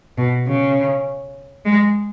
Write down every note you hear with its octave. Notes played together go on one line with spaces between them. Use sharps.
B2
C#3
G#3